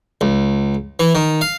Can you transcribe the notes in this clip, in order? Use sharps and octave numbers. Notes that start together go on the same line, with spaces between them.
C#2
E3
D#3
F5